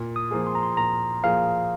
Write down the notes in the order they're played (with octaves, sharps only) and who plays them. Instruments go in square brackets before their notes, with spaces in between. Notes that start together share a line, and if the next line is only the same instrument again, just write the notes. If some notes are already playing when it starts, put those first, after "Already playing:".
Already playing: [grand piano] A#2
[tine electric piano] D#6
[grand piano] F3 A#3 G#4
[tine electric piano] C6
A#5
C6
[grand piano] A#2 [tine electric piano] A#5
[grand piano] F3 A#3 G#4 [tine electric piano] F5